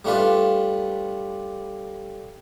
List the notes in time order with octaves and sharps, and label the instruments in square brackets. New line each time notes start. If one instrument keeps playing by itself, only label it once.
[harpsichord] G3 A3 D4 F4 B4